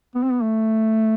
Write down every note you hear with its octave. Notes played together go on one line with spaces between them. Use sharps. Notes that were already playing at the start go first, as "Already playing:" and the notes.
B3
C4
B3
A3